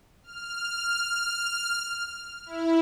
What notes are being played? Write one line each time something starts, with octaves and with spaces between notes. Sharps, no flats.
F6
E4